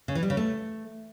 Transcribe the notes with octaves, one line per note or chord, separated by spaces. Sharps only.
C#3
E3
G3
C#3
A3